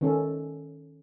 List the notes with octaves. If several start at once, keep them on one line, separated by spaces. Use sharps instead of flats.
D#3 C#4 A4